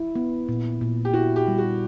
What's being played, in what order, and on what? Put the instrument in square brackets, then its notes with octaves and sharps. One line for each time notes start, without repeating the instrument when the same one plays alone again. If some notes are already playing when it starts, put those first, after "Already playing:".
Already playing: [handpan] E4
B3
A#2
A#2
[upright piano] G4
[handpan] E4 [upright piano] F#4
[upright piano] G4
[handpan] G3
[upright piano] F#4